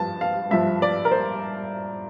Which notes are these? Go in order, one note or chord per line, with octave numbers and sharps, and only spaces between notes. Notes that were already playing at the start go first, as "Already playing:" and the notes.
Already playing: G2 F3 A5
F5
G2 F3 E5
D5
A#4
C5